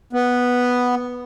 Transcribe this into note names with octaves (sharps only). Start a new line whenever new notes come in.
B3